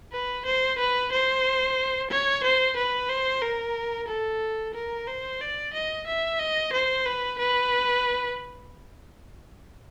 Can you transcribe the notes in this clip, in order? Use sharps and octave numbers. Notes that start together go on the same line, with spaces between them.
B4
C5
B4
C5
C#5
C5
B4
C5
A#4
A4
A#4
C5
D5
D#5
E5
D#5
C5
B4
B4